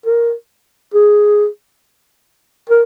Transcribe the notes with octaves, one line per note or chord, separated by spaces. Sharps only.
A#4
G#4
A#4